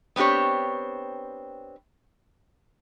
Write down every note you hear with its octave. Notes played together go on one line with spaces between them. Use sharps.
B3 C4 D4 G4 C#5